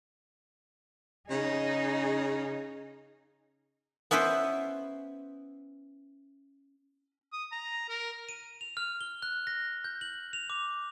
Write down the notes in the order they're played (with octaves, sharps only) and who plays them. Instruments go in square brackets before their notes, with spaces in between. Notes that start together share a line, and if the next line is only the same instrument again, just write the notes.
[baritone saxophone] C#3 [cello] D#4 G#4
[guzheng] B3 C#4 E4 B4 C5
[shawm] D#6
A#5
A#4
[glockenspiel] D#7
F7
F6
G7
F#6
A#6
G6
F#7
F7
D6